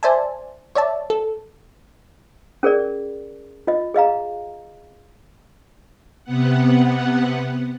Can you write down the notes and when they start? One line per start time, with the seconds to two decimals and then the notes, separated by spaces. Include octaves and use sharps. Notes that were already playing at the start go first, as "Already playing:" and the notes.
0.03 C5 D5 E5 G#5 A5
0.75 C#5 D5 E5 A5
1.10 A4
2.63 C#4 G#4 A#4 D5
3.67 F4 D#5
3.94 G#4 D#5 F5 A#5
6.24 C3 B3 F#5